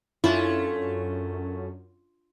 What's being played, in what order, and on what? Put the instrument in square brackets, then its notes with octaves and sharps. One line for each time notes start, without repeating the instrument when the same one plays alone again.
[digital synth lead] F#2 [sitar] A3 C#4 [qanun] D4 F4 [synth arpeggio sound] E4